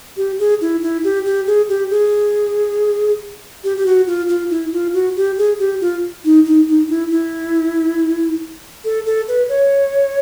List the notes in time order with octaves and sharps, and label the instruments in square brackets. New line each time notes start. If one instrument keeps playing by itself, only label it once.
[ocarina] G4
G#4
E4
E4
G4
G4
G#4
G4
G#4
G4
G4
F#4
F4
F4
E4
F4
F#4
G4
G#4
G4
F4
D#4
D#4
D#4
E4
E4
A4
A4
B4
C#5